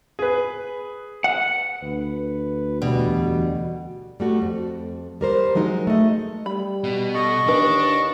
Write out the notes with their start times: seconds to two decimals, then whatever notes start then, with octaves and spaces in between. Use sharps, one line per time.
0.19 G#4 B4
1.24 F#5
1.83 D2 B4
2.82 E2 B2 G3
4.20 G3 A3 F#4
4.42 F2
5.21 G3 A#4 C5
5.55 F3 F#3 G#3 D#4
5.87 A3 D#5
6.46 G3 B5
6.84 B2
7.14 A4 D#5 C#6
7.47 D#2 E3 D4 B4